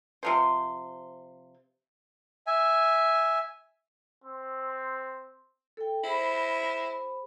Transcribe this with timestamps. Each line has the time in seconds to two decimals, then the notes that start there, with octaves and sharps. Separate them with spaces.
0.23 C3 F3 C5
2.47 E5 G#5
4.24 C4
5.77 A4 G5
6.04 E4 G#4 C5 B5